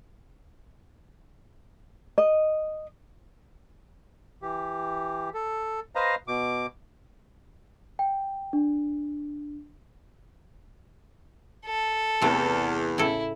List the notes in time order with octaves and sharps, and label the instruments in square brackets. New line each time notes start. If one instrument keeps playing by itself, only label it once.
[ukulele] D#5
[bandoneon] E3 G4
A4
B4 C5 D#5 F5 A#5
B2 D6
[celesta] G5
D4
[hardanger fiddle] A4
[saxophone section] E2 [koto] C3 A3
[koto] A2 C#3 A4 [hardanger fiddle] E4